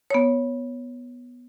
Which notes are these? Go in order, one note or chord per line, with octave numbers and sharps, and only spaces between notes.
B3 C#5